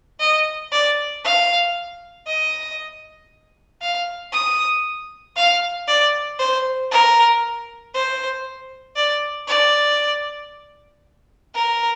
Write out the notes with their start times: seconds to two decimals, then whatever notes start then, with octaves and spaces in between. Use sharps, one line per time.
0.20 D#5
0.72 D5
1.24 F5
2.27 D#5
3.81 F5
4.32 D#6
5.36 F5
5.87 D5
6.39 C5
6.91 A#4
7.94 C5
8.96 D5
9.48 D5
11.55 A#4